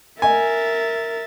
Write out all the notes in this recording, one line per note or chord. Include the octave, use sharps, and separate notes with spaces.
A#4 E5 G#5 A6